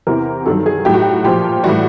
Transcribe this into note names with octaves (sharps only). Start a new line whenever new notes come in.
E2 C3 E3 A#4
G2 D#3 F#3 A4
G#4
A2 F#3 G4
F#4
G4
A#2 F3 G4
A2 E3 G3 F#4